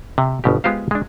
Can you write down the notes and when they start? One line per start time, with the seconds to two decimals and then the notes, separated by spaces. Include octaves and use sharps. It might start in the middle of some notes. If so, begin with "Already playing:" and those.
0.18 C3
0.44 G1 B2 G4
0.64 G#3 B3 F4 G4 C5 F5
0.91 G#3 D4